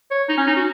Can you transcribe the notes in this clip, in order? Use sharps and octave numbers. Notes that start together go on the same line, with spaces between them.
C#5
D#4
C#4
D#4
F#4